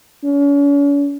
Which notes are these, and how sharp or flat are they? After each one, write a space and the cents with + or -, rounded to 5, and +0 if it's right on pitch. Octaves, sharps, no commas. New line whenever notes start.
C#4 +40